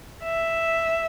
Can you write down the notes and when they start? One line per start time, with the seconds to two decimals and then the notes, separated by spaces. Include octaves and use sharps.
0.23 E5